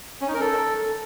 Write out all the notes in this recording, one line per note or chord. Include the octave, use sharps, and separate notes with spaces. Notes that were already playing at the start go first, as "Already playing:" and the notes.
C#4
D#4
A#4
A4